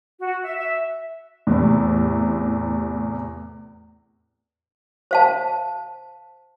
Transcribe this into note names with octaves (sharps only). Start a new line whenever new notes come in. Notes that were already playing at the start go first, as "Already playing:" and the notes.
F#4
E5
E5
E2 A2 C3
C5 F5 A5